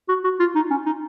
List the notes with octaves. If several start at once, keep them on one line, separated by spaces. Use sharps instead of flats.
F#4
F#4
F4
D#4
C#4
D#4